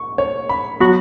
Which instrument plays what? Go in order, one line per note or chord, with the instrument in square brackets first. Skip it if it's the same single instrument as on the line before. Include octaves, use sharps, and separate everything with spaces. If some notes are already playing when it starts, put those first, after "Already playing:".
Already playing: [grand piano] C#6
C#5
B5
[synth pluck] F#3 B3 F#4 [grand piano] C#6